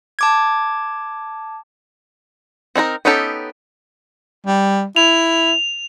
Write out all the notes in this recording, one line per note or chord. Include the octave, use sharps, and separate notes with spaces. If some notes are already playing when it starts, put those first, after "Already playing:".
A5 D6 G#6
C4 D#4 E4 A#4
B3 C#4 D#4 G4 A4
G3
E4 F7